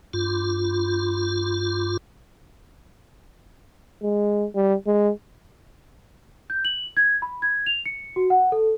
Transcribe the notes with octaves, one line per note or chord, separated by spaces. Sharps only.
G2 F4
G#3
G3
G#3
G6
F#7
G#6
B5
G#6
F7
C#7
F#4
F#5
A4